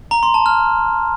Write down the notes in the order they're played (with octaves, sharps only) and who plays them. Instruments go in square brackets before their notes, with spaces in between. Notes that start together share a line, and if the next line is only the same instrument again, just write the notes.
[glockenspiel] A#5
C6
A5
F6